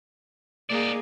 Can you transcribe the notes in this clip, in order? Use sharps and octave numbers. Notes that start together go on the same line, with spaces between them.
A#3 D#4 G#4 D5